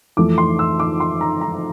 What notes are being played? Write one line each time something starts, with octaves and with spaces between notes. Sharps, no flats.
F2 E3 A3 D6
C6
E6
D6
C6
A#5
A#5